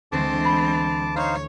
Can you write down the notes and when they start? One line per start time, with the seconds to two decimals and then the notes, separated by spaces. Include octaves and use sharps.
0.12 D2 E3 G#3 A3 C4 A5 D6
0.45 B5
1.16 D#4 C5 C#5 F5